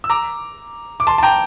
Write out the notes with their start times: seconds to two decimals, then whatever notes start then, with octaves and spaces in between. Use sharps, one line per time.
0.04 E6
0.10 A#5 D6
1.00 D6
1.07 A5 C6
1.18 A5
1.23 G5 A#5